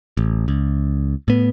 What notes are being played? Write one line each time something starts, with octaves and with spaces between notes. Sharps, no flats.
A1
C#2
A2 B3